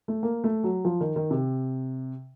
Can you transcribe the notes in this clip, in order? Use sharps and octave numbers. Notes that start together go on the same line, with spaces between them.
A3
A#3
A3
F#3
F3
D#3
D#3
C3